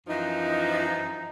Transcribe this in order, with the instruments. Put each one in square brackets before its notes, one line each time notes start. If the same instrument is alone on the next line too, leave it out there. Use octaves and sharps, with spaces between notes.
[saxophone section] F#2 E3 F3 [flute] D#4